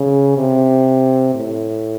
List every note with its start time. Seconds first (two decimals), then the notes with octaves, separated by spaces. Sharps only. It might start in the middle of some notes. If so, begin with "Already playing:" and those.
Already playing: C#3
0.37 C3
1.35 A2